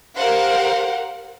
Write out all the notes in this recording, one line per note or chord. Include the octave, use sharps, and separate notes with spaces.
G4 A#4 C5 F5 F#5